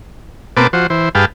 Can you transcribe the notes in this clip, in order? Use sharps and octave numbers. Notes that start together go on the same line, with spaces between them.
B2 A#3 C4 B4 A5 D6
F3 F#4 C5
E3 C5
G2 G#4 B4 F5 G5 A5